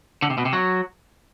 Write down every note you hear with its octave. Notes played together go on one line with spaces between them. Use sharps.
D3
C3
B2
C3
F#3